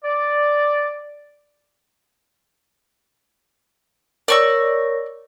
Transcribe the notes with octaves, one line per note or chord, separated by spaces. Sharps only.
D5
A#4 C#5 D5 C#6 E6 A#6